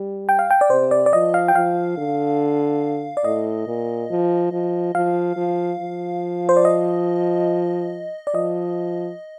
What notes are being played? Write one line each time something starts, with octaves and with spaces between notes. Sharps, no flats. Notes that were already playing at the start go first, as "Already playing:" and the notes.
Already playing: G3
G5
F5
G5
D5
C3 C5
D5
D5
F3 D#5
F5
G5
F3 F5
D3
D5
A2 D#5
A#2
F3
F3
F3 F5
F3
F3
C5
D5
D#5
D5
F3 D#5